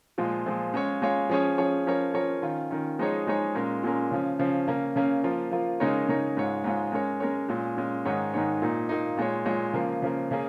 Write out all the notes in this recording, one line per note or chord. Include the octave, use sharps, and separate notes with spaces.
A#2 F3 G#3 F4
A#2 F3 G#3 F4
G#3 C#4 F4 C#5
G#3 C#4 F4 C#5
F3 C#4 G#4 C#5
F3 C#4 G#4 C#5
F3 C#4 A#4 C#5
F3 C#4 A#4 C#5
D#3 C#4 F4
D#3 C#4 F4
F3 G#3 D#4 G#4 C#5
F3 G#3 D#4 G#4 C#5
A#2 G#3 C#4 A#4
A#2 G#3 C#4 A#4
C#3 F3 C#4
C#3 F3 C#4
C#3 A#3 C#4
C#3 A#3 C#4
F3 A#3 F4
F3 A#3 F4
C#3 G#3 D#4 A#4 C#5
C#3 G#3 D#4 A#4 C#5
G#2 G#3 F4 C#5
G#2 G#3 F4 C#5
G#3 C#4 A#4 C#5
G#3 C#4 A#4 C#5
A#2 G#3 C#4
A#2 G#3 C#4
G#2 D#3 G#3 D#4 C#5
G#2 D#3 G#3 D#4 C#5
A#2 A#3 D#4
A#2 A#3 D#4
A#2 G#3 F4 C#5
A#2 G#3 F4 C#5
C#3 F3 A#3
C#3 F3 A#3
C#3 A#3 C#4 G#4